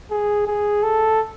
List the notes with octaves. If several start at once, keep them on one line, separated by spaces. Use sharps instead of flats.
G#4
G#4
A4